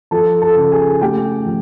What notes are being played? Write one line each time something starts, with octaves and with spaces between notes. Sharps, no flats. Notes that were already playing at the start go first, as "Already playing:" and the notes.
F3 A4 A5
A4 A5
C#3
G#4 G#5
A3 G4 G5
F3